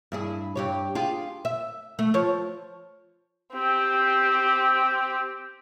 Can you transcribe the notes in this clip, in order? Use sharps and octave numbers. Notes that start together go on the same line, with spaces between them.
G2 E4 G#4
G2 G4 C#5
F4 G4 G#4
E5
A3
F3 C#5
C4 G4